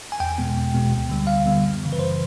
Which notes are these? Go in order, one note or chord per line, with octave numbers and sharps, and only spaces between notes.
G#5
E2 G5
B2 G#3 B3
E2
B2 G#3 B3
D2
D3 G3 B3
D2 F5
D3 G3 B3
F#2
C#3 E3
B4
F#2 C5